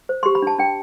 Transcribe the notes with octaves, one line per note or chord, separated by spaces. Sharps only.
C5
G4 C6
B5
D4 A5
D4 G5